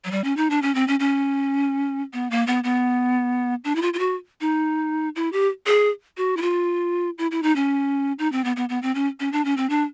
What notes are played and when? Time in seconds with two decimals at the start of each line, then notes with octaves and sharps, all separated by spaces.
0.05 F#3
0.11 G3
0.24 C#4
0.37 D#4
0.50 D4
0.62 C#4
0.75 C4
0.88 C#4
1.00 C#4
2.13 B3
2.31 A#3
2.47 B3
2.64 B3
3.64 D4
3.76 E4
3.82 F4
3.93 F4
3.99 F#4
4.41 D#4
5.16 E4
5.33 G4
5.67 G#4
6.17 F#4
6.37 E4
6.42 F4
7.18 E4
7.31 E4
7.43 D#4
7.56 C#4
8.19 D#4
8.32 C4
8.44 B3
8.56 B3
8.69 B3
8.83 C4
8.95 C#4
9.20 C#4
9.33 D4
9.45 C#4
9.57 C4
9.70 D4